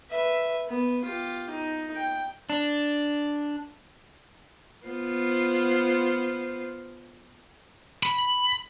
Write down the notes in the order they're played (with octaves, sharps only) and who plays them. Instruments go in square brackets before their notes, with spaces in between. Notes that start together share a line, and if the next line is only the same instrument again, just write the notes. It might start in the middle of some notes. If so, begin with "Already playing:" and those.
[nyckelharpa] B4 E5
B3
F4 G4
D#4
G5
[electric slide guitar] D4
[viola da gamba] B3 F4 C5
[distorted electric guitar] B5